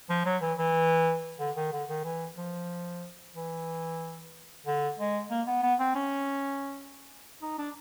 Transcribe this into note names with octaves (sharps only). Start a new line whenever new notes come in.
F3
F#3
E3
E3
D3
D#3
D3
D#3
E3
F3
E3
D3
G#3
A#3
B3
B3
C4
C#4
D#4
D4